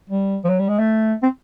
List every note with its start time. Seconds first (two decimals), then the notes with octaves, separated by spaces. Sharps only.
0.10 G3
0.44 F3
0.49 F#3
0.59 G3
0.69 G#3
0.79 A3
1.23 C4